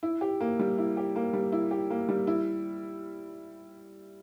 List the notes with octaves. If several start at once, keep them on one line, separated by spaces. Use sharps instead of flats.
E4
G4
A#3
G3
E4
G4
A#3
G3
E4
G4
A#3
G3
E4